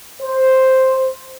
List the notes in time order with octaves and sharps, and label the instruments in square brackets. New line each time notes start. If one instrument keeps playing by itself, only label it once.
[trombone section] C5